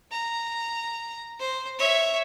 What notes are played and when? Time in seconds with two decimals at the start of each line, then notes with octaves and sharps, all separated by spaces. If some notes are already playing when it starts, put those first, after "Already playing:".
0.11 A#5
1.40 C5
1.79 C#5 E5